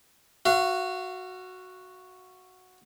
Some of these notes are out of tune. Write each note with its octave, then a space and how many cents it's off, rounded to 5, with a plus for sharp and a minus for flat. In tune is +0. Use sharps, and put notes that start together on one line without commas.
F#4 -5 F5 -35